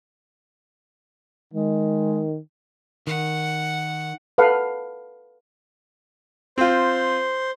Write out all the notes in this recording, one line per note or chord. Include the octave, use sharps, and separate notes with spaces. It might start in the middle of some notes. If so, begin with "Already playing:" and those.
D#3 G#3
D#3 F#5
A4 B4 F5 F#5
C4 F4 C5